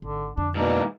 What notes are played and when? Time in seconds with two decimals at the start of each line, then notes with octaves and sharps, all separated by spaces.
0.02 G#1 D3
0.37 F2 D3 D4
0.55 G#2 B2 E3 A#3 D4